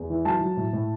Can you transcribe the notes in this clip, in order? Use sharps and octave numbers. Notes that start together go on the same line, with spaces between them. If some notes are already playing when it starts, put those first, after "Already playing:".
Already playing: E2
E3
F#3 A5
F#3
A2
A2